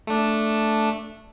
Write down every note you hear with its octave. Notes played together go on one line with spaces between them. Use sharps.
A3 D4